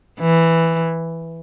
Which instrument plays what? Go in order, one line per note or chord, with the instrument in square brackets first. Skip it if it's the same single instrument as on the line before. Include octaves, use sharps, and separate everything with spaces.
[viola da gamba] E3